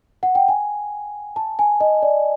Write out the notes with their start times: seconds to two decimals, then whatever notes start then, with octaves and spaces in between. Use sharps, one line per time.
0.23 F#5
0.35 G5
0.48 G#5
1.36 A5
1.59 G#5
1.80 D#5
2.03 D5